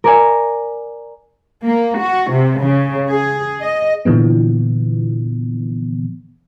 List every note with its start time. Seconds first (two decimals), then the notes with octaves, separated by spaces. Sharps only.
0.04 A#4 D5 G#5
1.64 A#3
1.99 F#4
2.31 C3
2.62 C#3
3.08 G#4
3.61 D#5
4.05 A#2 D3 E3 F3 B3